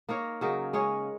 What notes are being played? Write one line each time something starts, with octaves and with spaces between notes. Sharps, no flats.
A#3 D#4 A#4 C#5
C#3 F#3 D#4 A#4
G#3 C#4 G#4 C#5